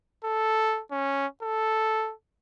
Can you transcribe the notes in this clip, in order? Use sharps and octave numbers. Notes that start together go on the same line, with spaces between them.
A4
C#4
A4